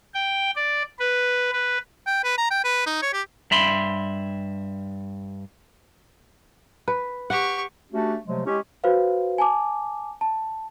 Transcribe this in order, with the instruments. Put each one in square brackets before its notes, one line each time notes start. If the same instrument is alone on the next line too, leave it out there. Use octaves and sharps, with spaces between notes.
[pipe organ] G5
D5
B4
B4
[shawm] G5
B4
A#5
G5
B4
D#4
C#5
G4
[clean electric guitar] G2 E5 B5 C6
[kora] B4
[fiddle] G4 C#6 [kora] F#5
[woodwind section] A3 C#4 D4 F#4 G4
C3 F3 F#3 G#3 A3
G#3 C#4 E4 G4
[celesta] F#4 B4 C5 F5
G#5 A5 D6
A5